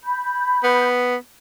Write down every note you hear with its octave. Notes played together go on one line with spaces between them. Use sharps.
B5 G6
B3